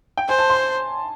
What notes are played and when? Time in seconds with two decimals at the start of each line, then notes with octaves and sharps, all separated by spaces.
0.17 G5
0.28 C5 G#5
0.39 A5
0.50 C6